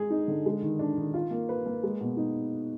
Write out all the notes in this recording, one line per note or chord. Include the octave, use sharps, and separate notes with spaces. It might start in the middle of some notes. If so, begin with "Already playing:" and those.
Already playing: G#3 G#4
D#4
D3
G#3
D#3
D4
D#3
F4
A#3
B4
A#3
G#3
B2
D#4